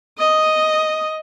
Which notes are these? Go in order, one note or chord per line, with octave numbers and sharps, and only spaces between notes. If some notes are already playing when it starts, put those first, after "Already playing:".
D#5 D#6